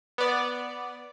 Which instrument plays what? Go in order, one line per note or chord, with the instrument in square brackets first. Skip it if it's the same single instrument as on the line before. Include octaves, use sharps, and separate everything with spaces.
[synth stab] B3 D5